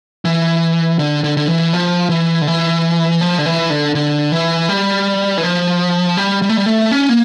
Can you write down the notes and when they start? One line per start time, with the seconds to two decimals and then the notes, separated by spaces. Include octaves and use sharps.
0.25 E3
0.99 D3
1.24 D3
1.37 D3
1.48 E3
1.73 F3
2.09 E3
2.42 D3
2.47 E3
3.21 F3
3.38 D3
3.46 E3
3.70 D3
3.95 D3
4.32 E3
4.69 G3
5.38 E3
5.43 F3
6.17 G3
6.42 G3
6.49 A3
6.57 G3
6.66 A3
6.91 C#4
7.09 A#3